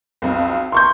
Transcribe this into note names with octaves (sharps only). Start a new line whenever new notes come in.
B1 F2
C6 C#6 G6